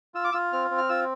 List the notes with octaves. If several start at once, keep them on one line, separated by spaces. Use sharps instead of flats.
F4 E6
D6
F4 E6
C4 F6
C4
F6
F4 E6